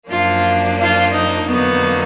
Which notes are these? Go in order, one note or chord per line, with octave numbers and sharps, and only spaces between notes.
F#2 F3 A#3 D4 F4
F4
D#4
F2 D3 F#3 A#3 B3 D#4